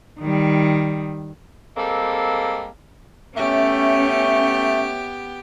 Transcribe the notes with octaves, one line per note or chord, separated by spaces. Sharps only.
D#3 G3
G3 G#3 A#3 C4 A4
A3 B3 C#4 G4 E5